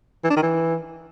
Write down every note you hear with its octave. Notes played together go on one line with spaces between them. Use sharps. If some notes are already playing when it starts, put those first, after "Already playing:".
E3
D4
D#3
E3